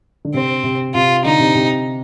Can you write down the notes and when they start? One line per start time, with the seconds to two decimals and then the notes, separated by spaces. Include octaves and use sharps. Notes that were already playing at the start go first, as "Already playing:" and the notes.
0.25 D3
0.34 C3 C4
0.64 C3
0.95 C3 F4
1.24 D3 D#4
1.40 C3
1.55 C3